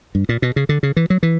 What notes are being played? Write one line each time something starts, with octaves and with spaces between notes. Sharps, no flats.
G2
A#2
B2
C#3
D3
C#3
E3
F#3
E3